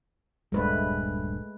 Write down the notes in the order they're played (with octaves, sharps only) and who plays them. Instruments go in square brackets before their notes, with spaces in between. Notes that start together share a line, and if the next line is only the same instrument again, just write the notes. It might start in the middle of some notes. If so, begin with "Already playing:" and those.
[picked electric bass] D1 A#1 G2 [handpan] G#3 A3 B4